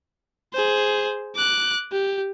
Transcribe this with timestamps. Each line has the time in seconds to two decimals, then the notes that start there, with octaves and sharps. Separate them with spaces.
0.53 G#4 C5
1.36 D6 F#6
1.92 G4